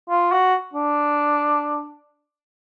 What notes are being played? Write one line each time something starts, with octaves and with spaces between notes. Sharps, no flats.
F4
F#4
D4